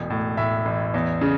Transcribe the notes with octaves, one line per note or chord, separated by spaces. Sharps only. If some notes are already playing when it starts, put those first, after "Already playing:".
Already playing: E1 A1
A2
A2 E5
A1
E2
C#3